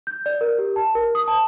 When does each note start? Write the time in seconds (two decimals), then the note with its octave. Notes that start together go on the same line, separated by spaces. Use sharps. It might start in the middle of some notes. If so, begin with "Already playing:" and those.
0.07 G6
0.26 D5
0.41 A#4
0.59 G4
0.76 A5
0.95 A#4
1.15 D#6
1.28 A5